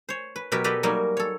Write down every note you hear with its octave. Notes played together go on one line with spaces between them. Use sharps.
C5 C#5
B4
B2 F#3 G4 A#4 B4
G4 A4 B4 D5 D#5
F#3 G3 A#3 D#4 A#4 G#5
A4 C#5